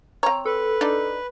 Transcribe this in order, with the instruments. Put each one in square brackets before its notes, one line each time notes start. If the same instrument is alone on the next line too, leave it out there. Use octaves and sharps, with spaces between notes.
[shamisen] C4 C#5 [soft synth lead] A#5
[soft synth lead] A4 [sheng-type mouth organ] B4
[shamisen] D4 D#4 D5